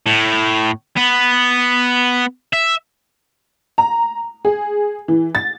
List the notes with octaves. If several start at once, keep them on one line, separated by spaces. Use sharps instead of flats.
A2
B3
E5
A#5
G#4
E3
A6